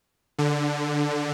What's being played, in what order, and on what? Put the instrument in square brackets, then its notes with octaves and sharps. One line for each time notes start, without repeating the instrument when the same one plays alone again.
[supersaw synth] D3